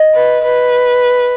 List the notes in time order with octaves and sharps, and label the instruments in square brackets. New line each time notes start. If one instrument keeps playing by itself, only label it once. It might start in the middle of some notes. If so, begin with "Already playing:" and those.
Already playing: [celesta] D#5
[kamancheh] B4
B4